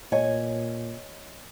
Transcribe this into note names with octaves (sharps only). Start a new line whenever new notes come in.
A#2 C#5 D#5 G#5